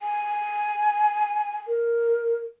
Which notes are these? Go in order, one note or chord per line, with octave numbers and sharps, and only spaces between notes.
G#5
A#4